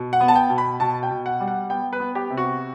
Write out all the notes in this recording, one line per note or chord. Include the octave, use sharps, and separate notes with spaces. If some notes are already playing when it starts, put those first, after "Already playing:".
Already playing: B2
F#5
B3
A5
G5
B2
B5
B2 A5
G5
B2
F#5
G3
F#5
B3 G5
B4
B3
G4
C3
F#4